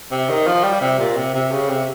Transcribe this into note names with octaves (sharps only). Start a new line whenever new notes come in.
C3
D#3
F3
G3
C3
A#2
C3
C3
C#3
C3